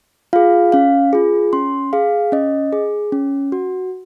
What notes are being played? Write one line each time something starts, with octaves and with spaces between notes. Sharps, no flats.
F4 G#4 F5
C#4 F5
F4 G#4
C#4 C6
G#4 F5
C#4 D#5
G#4
C#4
F#4